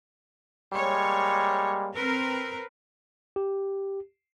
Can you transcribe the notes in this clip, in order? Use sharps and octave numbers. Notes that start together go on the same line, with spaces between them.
G3 G#3 A#3 C#5
C4 A#4 B4
G4